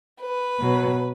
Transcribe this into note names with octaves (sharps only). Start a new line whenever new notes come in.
B4
B2 F#3